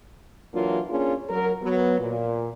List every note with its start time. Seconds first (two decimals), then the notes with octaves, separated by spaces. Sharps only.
0.54 E3 F#3 A#3 D4 F4
0.90 A#3 C#4 D4 F4 G#4
1.30 F#3 A#4
1.63 F#3 B3
1.99 A#2